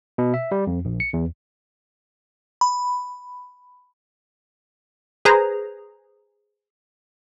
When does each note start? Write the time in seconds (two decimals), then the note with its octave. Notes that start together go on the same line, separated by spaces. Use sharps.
0.18 B2
0.34 E5
0.52 G3
0.67 F2
0.85 A#1
1.00 C#7
1.13 E2
2.61 B5
5.25 G#4 B4 C5 A#5